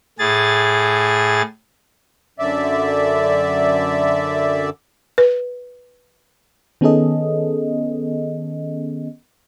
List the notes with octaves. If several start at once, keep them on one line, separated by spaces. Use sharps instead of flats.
A2 G#4 A6
F#2 D3 D5 E5
B4
D#3 B3 C#4 G#4 A4 D#5